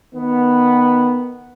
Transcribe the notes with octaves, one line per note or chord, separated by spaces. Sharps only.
D#3 B3